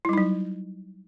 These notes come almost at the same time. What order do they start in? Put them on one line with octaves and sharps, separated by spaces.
E4 G3 D#4 F#3